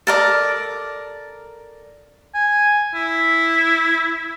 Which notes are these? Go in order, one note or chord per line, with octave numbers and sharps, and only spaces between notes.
A4 A#4 D5
G#5
E4